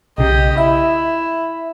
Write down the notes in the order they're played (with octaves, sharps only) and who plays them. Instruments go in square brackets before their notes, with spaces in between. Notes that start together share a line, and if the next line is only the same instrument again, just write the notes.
[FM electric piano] B1 C#3 [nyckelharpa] G4 D#5
[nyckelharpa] E4 [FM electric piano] E5